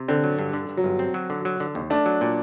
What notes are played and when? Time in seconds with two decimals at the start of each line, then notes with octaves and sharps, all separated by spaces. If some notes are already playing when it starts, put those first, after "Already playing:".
Already playing: C3
0.08 D3 C4
0.24 F#3
0.39 G2
0.53 D3
0.69 G2
0.77 F#3
0.84 G1
0.99 C4
1.14 F#3
1.30 D3
1.45 F#3
1.60 D3
1.75 D#2
1.90 A3 D4
2.06 F#3
2.21 A#2